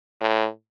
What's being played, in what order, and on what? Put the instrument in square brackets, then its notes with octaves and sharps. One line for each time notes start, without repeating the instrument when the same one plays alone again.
[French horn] A2